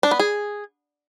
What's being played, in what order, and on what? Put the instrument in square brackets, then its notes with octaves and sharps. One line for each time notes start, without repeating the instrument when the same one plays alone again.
[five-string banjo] D4
B3
G#4